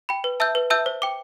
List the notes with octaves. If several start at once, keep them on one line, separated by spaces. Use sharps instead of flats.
G5 B5
B4
E5 A5 E6 G6
B4
E5 A5 E6 G6
C5
G5 D6